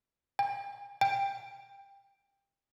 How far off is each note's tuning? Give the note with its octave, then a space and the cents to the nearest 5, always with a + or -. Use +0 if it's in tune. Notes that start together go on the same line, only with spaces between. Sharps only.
G5 +40
G5 +20